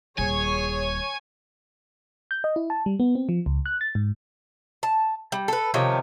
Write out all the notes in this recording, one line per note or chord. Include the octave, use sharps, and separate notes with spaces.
D#1 G#4 C#5 G#5
G6
D#5
E4
A5
G3
B3
C4
F3
C#2
F#6
A6
G#2
A5
G3
A4 B4
C3 D#3 F3 C#4